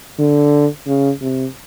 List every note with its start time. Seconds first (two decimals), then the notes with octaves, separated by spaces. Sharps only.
0.19 D3
0.87 C#3
1.22 C3